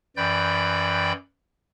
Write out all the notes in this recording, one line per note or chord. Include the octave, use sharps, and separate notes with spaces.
F#2 E3 D5 G5 B5 G6